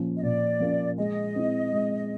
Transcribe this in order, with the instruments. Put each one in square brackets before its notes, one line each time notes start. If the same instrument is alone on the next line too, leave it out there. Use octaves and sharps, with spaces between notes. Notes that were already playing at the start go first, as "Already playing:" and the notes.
Already playing: [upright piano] A#2 F3 A#3 C#4
[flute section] D#5
[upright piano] A#2 [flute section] D5
[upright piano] F3 A#3 C#4
[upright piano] G#3 [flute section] D#5
[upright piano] C4 E4
G#3